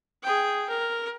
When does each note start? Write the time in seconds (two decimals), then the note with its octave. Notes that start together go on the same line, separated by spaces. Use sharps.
0.23 G#4 G5
0.70 A#4